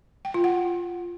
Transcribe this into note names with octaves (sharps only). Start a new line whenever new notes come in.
G5
F4
F#5